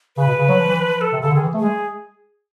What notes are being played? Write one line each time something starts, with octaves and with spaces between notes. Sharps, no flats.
C#3 B4
B2
C#3
F#3
F3
E3
F3
A4
C3
C#3 A4
D3
D#3 G#4
E3
A3
G#3 G#4